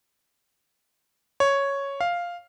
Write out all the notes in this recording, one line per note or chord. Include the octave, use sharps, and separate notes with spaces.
C#5
F5